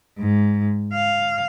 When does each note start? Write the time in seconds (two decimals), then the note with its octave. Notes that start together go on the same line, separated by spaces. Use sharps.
0.19 G#2
0.93 F5